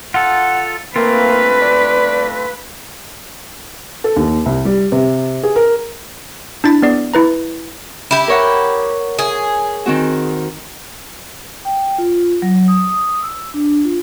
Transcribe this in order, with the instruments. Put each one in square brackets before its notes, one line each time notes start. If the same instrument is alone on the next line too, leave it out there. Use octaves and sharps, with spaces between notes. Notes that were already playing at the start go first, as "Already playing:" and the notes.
[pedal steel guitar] F4 A4 [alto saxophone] F#5
[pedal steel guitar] A3 C4 F4 [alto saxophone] A#3 [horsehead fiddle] B4
[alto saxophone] D5
[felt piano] A4
D#2
C2
G3
C3
G#4
A#4
[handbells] D4 E4 A6 B6
B3 G#4 D5 C7
E4 B4 A#5
[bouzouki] E4 G4
[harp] A#4 C#5 F#5
[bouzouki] G#4 [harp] G#5
[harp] D#3 C4 F#4
[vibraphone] G5
F4
F#3
D#6
D#6
E6
D4
F4